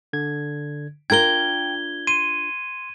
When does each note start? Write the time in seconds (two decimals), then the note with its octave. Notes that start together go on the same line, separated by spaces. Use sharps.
0.13 D3 G#6
1.10 D4 F4 A#4 G5 G#6 G7
2.07 C6 D#7